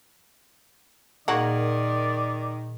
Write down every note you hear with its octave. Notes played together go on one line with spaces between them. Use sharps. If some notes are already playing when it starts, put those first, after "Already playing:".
A#2 D#3 A#3 F#4 G#4 D5